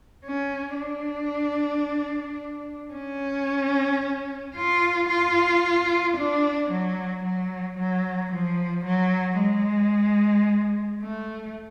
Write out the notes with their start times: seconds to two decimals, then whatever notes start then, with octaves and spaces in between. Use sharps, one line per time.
0.25 C#4
0.78 D4
2.93 C#4
4.56 F4
5.09 F4
6.17 D4
6.71 F#3
7.24 F#3
7.78 F#3
8.32 F3
8.86 F#3
9.40 G#3
11.01 A3